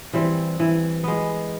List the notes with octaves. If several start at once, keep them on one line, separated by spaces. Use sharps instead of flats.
E3 G3 C4
E3
G#3 B3